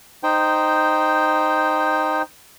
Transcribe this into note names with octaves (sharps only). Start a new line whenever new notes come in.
D#4 C5 G5